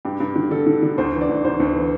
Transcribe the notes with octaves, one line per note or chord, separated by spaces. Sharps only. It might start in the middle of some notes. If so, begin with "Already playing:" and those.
G2 G4
G2
D3
D3 A4
D3
D3
D2 C5
E3
D5
D2
D2 C5
D2
E3